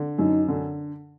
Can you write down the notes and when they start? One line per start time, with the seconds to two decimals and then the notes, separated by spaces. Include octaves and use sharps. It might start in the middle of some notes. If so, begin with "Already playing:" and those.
Already playing: D3
0.19 F#2 D#4
0.49 D3